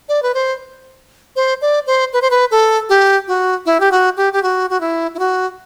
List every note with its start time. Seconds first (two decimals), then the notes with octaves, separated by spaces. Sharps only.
0.09 D5
0.23 B4
0.34 C5
1.36 C5
1.62 D5
1.87 C5
2.13 B4
2.22 C5
2.30 B4
2.51 A4
2.89 G4
3.28 F#4
3.66 E4
3.80 G4
3.92 F#4
4.17 G4
4.33 G4
4.43 F#4
4.70 F#4
4.81 E4
5.14 E4
5.19 F#4